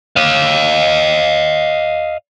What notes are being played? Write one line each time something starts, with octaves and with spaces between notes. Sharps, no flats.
D#5 F5